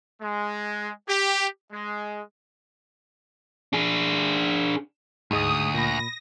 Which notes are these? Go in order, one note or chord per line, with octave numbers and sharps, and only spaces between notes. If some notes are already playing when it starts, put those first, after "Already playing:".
G#3
G4
G#3
D4 G#4
D2 G#2 G#3 D#6
A#2 B5 A#6